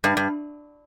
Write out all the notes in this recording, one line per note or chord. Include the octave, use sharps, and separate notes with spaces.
G2
G2